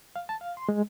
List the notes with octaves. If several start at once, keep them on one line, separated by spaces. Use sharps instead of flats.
F5
A5
F5
C6
G#3